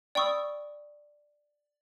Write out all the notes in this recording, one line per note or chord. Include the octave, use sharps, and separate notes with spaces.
D5 G5 B5 C#6 D#6 E6